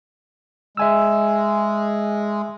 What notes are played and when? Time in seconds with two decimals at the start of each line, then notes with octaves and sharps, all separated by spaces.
0.77 G#3 E5 G#5 E6